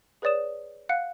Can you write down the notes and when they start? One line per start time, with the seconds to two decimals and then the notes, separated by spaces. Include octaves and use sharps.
0.22 G#4 B4 C#5 D5 D#6 E7
0.89 F5 F#5 F#6 C#7